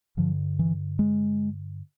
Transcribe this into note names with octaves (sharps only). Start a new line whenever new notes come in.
G2 D3 F3
E3
G#3